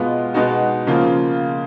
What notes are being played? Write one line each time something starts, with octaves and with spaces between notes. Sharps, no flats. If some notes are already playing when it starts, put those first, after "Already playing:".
Already playing: B2 G#3 B3 F4
B2 G#3 B3 D#4 F#4
C#3 F3 A#3 F4